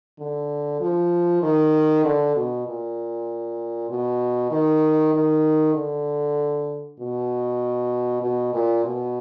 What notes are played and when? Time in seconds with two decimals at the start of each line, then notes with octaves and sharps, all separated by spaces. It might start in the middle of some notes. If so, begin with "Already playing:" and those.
0.19 D3
0.81 F3
1.42 D#3
2.05 D3
2.35 B2
2.67 A#2
3.90 B2
4.51 D#3
5.14 D#3
5.75 D3
6.99 B2
8.22 B2
8.53 A#2
8.84 B2